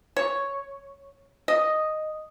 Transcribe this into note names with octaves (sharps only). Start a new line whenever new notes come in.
C#5
D#5